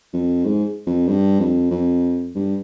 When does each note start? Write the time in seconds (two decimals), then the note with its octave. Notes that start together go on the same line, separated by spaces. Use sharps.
0.13 F2
0.45 G#2
0.86 F2
1.08 G2
1.40 F2
1.71 F2
2.35 G2